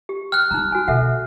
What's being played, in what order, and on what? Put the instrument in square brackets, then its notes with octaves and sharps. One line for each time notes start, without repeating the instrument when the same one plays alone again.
[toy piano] G4
[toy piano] G5 [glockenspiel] F6 F#6
[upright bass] G1 [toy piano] D#4 A#5
[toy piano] F#4 G#5
[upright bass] B2 D3 [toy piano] A4 E5 F#5